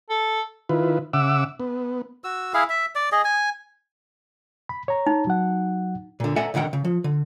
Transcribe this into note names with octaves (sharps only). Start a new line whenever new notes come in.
A4
D#3 E4 F4 B4
C#3 E5 F#5 D6 E6
B3
F#4 E6
E4 G#4 F5
E5
D5
G#4 D#5
G#5
B5
C#5 A#5
D#4
F#3 F#5
A#2 D3
A4 D5 E5 F#5 G#5 A#5
C2 D3 D#3 F#5 G5
C#3
F3
D3